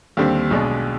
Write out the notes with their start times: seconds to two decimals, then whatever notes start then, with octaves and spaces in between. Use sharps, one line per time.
0.17 D#2 D3 G3 C4
0.50 B1 B2 G#3 D4